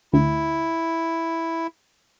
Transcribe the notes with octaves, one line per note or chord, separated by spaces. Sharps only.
D2 E4